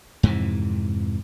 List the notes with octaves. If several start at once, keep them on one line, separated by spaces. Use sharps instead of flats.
F2 G#2 C3 E3